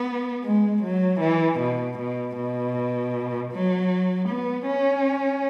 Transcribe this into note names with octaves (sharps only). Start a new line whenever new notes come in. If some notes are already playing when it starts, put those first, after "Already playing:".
Already playing: B3
G#3
F#3
E3
B2
B2
B2
F#3
B3
C#4